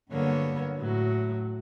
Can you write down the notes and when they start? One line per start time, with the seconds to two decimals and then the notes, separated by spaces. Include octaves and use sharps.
0.10 G2 D3 F#3 A#3 B3 C#5
0.79 A2 F#3